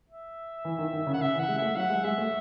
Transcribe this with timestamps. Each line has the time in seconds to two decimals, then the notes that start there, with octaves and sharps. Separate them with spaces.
0.09 E5
0.65 E3
0.78 D#3
0.93 D#3
1.07 C#3
1.14 F#5
1.20 C#3 E5
1.35 E3
1.39 F#5
1.48 G#3
1.58 A3 E5
1.76 F#3 F#5
1.90 G#3
2.04 G#3 E5
2.18 A3